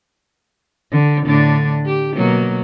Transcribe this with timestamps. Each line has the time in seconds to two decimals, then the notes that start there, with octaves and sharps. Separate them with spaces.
0.92 D3
1.25 A2 D3 D4
1.85 G4
2.16 B2 F#3 A#3